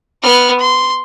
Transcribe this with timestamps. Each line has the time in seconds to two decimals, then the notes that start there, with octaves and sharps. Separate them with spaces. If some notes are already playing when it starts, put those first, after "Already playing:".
0.23 B3 F6
0.59 C6